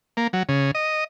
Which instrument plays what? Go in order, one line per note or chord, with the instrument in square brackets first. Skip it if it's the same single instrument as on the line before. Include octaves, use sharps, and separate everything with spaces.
[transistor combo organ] A#3
F#3
C#3
D#5